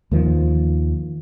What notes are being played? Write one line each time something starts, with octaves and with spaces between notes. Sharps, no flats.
D#2 D#3 F3